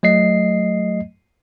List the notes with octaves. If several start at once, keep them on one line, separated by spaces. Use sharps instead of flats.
F#3 A3 D#5 C7